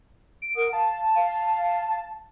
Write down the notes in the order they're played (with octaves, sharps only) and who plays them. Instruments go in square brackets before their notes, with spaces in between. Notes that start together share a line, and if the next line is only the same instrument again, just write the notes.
[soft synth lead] D7
[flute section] A#4 F#5 D#6
[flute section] F5 [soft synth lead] A5
[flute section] F5